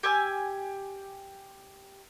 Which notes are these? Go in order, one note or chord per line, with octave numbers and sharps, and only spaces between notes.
G4 G#5 E6